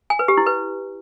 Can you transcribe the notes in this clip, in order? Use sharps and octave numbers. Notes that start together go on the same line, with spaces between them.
G#5
B4
G4
E4
B4